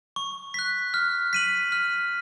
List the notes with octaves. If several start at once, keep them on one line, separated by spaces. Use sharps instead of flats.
C#6
F#6 B6
F6
B6 D#7 F#7
F6